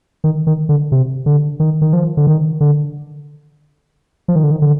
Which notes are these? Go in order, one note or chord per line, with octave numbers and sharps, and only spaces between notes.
D#3
D#3
D3
C3
D3
D#3
D#3
F3
D3
D#3
D3
F3
D#3
D3
D#3
D3